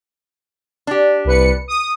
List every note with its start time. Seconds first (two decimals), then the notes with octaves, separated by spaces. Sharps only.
0.87 D4 G4
1.25 C2 B4 C#7
1.68 D#6